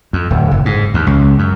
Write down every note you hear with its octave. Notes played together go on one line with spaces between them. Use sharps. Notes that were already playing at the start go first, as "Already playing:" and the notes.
F2
D1
F#1
G#2
D#2
C#2
F#2